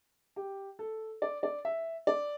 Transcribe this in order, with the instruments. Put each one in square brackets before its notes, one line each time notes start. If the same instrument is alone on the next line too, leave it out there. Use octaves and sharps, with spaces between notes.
[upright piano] G4
A4
D5
D5
E5
D5